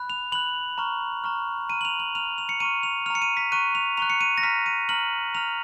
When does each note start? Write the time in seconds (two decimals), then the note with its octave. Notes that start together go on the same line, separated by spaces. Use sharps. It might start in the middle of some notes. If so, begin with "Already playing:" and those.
Already playing: B5 F#6
0.10 F7
0.32 B5 F#6 F#7
0.78 A#5 C#6 F6
1.24 A#5 C#6 F6
1.69 A#5 F6 D#7
1.81 F#7
1.85 F7
2.00 F#7
2.15 A#5 F6 F7
2.38 F7
2.49 C#7
2.60 A#5 C#6 F6 D#7
2.83 F7
3.06 A#5 C#6 F6 F7
3.15 C#7
3.22 D#7
3.37 B6
3.52 A#5 C#6 F#6 D#7
3.75 F7
3.97 A#5 C#6 F#6 F7
4.10 C#7
4.21 D#7
4.38 A#6
4.43 A#5 F6 B6
4.66 D#7
4.89 A#5 F6 F#7
5.35 A#5 F6 F7